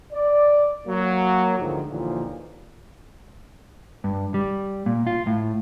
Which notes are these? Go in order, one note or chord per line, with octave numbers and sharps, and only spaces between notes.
D5
F#3 A#3
D2 G#2 D3 D#3 F3
D#2 A#2 D3 E3 F3
G2
G3
A#2
F4
A2